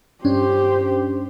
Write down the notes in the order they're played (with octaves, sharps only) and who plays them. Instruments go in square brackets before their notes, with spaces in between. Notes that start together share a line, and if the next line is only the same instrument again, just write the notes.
[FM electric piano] G2 C#4 D4 [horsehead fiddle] G4 C5